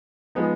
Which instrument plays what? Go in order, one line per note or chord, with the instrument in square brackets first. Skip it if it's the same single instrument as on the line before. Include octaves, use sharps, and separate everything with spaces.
[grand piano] F3 G#3 B3 D#4